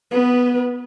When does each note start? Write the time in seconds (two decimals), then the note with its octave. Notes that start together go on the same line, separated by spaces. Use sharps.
0.11 B3 B4